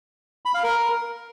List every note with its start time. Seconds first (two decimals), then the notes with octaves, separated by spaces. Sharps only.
0.45 B5
0.54 F5
0.63 A#4